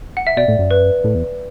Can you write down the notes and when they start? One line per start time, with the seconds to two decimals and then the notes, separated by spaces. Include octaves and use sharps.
0.17 F#5
0.27 E5
0.37 B2 D5
0.48 A2
0.59 F#2
0.71 B4
1.04 A2
1.15 E2